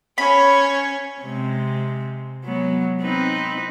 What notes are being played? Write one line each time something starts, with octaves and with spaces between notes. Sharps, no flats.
C#4 C#5 B5
C3 G#3
F#3 G#3 B3
C4 D#4 B4